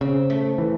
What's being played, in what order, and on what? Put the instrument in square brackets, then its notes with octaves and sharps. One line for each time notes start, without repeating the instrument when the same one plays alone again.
[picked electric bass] C#3 [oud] C4
[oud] A3
[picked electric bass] E3